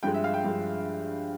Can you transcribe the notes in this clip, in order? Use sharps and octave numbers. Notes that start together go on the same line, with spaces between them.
G2 F3 G#3 G5
E5
F5
G5
G2 F3 G#3